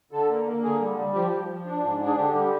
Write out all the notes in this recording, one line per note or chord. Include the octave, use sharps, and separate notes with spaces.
D3 A4
A#3
A#3
D3 G#4
G3
G3
F3 G4
F3
F3
D4
G#2
D4
G#4
D3 G4
G3